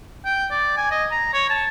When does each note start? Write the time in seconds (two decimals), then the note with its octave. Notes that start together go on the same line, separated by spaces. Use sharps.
0.24 G5
0.51 D5
0.77 G#5
0.91 D#5
1.11 A#5
1.33 C#5
1.50 A5